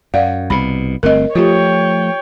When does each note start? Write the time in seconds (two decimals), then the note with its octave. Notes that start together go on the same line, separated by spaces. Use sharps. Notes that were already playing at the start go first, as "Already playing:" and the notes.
0.14 F#2 D5 F5 F#5
0.50 C2 B2 B5
1.03 G1 A3 C4 A#4 D#5
1.35 F3 A3 F4 G4 C#5 G5